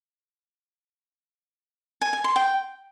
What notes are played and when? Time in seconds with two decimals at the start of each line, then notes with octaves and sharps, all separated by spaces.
2.01 G#5
2.13 G#5
2.24 C6
2.36 G5